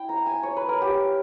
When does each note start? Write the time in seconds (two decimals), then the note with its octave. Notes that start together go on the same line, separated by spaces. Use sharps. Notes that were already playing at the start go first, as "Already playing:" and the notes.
Already playing: E4 G5
0.09 A#5
0.26 G#5
0.43 C#5
0.57 B4
0.69 A#4
0.82 G4